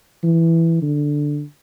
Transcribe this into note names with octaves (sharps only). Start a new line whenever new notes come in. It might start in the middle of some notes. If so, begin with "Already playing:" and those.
E3
D3